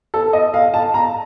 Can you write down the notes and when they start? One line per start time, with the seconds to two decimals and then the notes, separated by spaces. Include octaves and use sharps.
0.14 A4
0.33 D#5
0.54 F5
0.74 A5
0.94 A#5